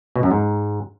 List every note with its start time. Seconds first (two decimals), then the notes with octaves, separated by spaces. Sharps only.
0.16 B2
0.23 F#2
0.31 G#2